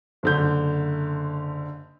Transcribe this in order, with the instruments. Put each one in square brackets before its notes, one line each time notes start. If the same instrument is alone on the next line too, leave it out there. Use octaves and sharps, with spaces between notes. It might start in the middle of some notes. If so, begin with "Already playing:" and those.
[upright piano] F#1 D3 G6